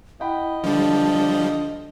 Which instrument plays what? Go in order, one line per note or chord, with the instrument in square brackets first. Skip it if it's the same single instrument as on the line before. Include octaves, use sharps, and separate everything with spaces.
[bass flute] E4 [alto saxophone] D#5 [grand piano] F#5 G5 B5
[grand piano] D3 [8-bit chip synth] F3 G3 [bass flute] D4